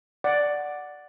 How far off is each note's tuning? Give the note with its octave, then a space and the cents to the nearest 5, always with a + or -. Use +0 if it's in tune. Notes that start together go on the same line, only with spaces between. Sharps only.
D5 +0 F#5 +0